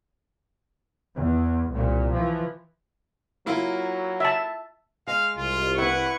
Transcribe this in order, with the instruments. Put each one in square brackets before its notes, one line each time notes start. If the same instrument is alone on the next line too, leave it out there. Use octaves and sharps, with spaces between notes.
[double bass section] E2
C2 A#2
E3 F3
[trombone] F#3 [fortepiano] A#3 E4 F4
[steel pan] E5 A5
[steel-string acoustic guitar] G#3 [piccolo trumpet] F5
[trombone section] C2 [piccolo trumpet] F4
[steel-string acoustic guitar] E4 B4 [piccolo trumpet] F#5 [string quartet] C#6